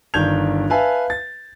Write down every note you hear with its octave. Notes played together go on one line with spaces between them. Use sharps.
G1 D#3 D4 G6 G#6 F7
B4 E5 F5 G#5 A5
A6